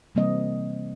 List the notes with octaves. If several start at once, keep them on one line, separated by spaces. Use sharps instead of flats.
C3 E3 G3 A#3 C4 D#5